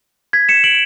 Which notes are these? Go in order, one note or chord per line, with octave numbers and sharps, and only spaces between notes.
G#6 B6
C#7 E7
D7 F#7